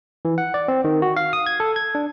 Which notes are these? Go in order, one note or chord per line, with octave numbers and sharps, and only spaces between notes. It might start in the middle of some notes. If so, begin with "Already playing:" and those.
E3
F#5
D5
C4
D#3
F#4
F5
D#6
G#6
A4
G#6
D4